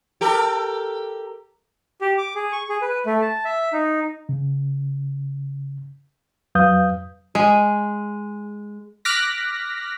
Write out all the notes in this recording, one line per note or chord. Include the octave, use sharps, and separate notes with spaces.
G4 A4 A#4
G4
D6
G#4
C#6
G#4
B4
A3
A5
E5
D#4
C#3
F2 F#3 B4 F5 D#6 G6
G#3 G#4
D6 F6 F#6 A#6 B6